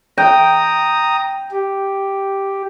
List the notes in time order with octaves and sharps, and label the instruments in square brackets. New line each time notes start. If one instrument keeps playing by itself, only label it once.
[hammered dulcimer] G5 [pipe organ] A#5 D#6
[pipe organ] G4